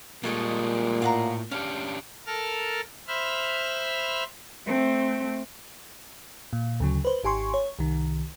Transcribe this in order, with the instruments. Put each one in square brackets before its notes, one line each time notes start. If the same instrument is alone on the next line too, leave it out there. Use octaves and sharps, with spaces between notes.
[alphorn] A#2 [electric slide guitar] G3 G#3 A#3 [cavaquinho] A4 C#5 D#5
[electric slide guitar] A2 [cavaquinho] F5 F#5 A#5
[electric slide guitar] C#4 D4 G4 [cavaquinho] F5
[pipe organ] A4 A#4 A5 F6
C5 E5 B5 F6
[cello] A3 C4
[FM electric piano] A#2
D2 C#3 F#3
B4 C5
G#1 G4 G#5 C6 C#6
C#5
C2 D#3